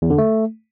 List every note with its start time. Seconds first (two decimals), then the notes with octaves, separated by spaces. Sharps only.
0.02 E2
0.10 D3
0.18 A3